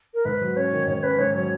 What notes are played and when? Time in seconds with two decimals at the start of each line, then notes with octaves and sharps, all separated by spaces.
0.14 A#4
0.25 G#2 B4
0.41 F#3
0.56 C#4 C#5
0.72 D#3
0.87 G#2 C#5
1.03 C#4 B4
1.18 G#2 C#5
1.34 F#3 C#5